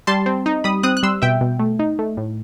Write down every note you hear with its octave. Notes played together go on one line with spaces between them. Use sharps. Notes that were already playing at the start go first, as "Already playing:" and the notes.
G3 A5 C6
C4
D#4
G3 B5 D#6
C4 D#6 F#6
F#6
G3 C6 E6
B2 E5 G5
B2
A3
D#4
A3
A2